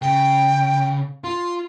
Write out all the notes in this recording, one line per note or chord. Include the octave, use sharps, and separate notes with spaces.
C#3 G5
F4 C6